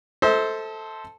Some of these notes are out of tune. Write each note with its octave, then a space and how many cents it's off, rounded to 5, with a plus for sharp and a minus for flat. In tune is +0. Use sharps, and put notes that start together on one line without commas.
A4 +0 C5 +0 E5 -45